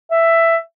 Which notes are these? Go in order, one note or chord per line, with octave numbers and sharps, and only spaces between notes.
E5